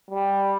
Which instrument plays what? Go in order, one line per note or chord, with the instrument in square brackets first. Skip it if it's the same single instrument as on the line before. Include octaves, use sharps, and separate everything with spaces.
[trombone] G3